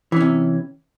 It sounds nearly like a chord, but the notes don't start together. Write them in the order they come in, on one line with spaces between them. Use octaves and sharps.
E3 C#4 C3